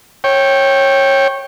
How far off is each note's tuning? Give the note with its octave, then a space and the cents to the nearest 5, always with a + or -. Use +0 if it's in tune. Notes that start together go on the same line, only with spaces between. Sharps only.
C#5 -20 G5 +0